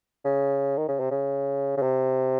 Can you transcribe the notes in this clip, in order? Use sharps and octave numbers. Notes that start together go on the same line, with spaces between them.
C#3
D#3
C#3
C3
C#3
C#3
C3